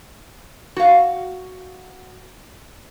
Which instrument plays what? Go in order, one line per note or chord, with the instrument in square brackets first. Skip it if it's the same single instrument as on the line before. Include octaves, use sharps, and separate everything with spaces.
[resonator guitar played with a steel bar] F#4 F5